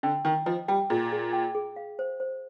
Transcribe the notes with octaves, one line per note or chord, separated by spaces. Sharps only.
D3 G5
D#3 G5
F3 D#5
G3 G5
A#2 G#4
G#4
G5
G#4
F5
C5
C5